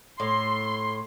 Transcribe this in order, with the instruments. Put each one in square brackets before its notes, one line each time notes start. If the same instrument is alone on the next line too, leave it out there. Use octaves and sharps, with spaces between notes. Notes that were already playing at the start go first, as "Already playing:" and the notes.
[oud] A2 [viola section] C6